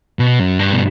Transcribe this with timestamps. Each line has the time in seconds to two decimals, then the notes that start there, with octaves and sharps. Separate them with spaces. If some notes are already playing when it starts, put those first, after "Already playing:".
0.19 B2
0.39 F#2
0.59 G2
0.73 B2